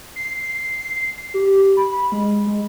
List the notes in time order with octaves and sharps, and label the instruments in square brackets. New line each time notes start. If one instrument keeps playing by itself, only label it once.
[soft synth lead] C7
G4
B5
G#3
G#3